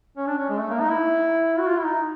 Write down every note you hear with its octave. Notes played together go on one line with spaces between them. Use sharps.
C#4
D4
C#4
G#3
A3
A#3
D#4
E4
F#4
F4
E4
D#4